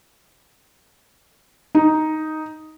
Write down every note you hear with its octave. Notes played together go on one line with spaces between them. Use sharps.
D#4